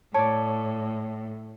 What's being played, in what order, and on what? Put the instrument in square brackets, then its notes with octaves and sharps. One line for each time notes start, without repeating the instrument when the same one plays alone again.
[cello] A2 [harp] C#5 D5 [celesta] A5